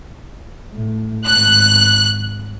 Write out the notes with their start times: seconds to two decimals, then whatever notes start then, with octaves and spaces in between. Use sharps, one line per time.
0.74 A2
1.27 G#1 F#6